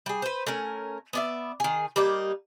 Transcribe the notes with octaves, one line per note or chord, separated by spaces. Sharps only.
G3 G#4
B4 C5
A3 C#4 A#4
B3 D5 E5
D#3 G#4
G3 A#3 D#4 D5